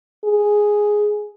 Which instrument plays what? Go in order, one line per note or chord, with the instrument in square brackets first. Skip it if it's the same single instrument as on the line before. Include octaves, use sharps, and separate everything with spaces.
[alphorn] G#4